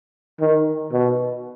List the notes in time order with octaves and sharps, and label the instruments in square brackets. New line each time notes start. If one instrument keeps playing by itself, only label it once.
[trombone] D#3
B2